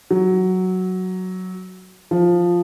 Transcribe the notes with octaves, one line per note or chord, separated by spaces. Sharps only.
F#3
F3